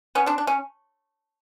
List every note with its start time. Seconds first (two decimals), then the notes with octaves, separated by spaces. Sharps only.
0.15 B3 C#4
0.26 C4 D4
0.38 D4
0.47 C#4